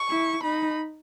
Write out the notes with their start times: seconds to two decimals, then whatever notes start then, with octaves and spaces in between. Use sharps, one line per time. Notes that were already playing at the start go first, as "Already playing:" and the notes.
Already playing: C#6
0.10 E4
0.43 D#4 B5